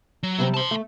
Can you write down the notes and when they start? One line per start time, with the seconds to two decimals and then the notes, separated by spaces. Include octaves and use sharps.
0.23 F#3
0.38 C3 G3 C4
0.54 A5 C6
0.71 A3